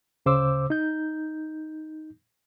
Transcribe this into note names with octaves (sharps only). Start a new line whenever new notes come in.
D2 C#3 C5 D6 E6
D#4 G6